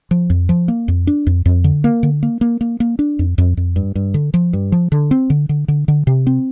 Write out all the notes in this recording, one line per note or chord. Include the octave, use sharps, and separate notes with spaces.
F3
F2
F3
A#3
F2
D4
F2
F2
D3
A#3
D3
A#3
A#3
A#3
A#3
D4
F2
F2
F2
G2
G2
D3
F3
G2
F3
D3
C4
D3
D3
D3
D3
C3
C4